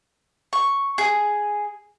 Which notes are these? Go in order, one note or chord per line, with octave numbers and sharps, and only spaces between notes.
C#6
G#4